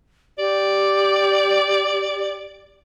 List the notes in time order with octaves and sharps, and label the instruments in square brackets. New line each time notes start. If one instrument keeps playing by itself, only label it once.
[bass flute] G4 [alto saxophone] D5